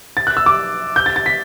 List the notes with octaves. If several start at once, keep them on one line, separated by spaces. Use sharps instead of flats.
A6
F#6
E6
D6
G6
A6
A6
B6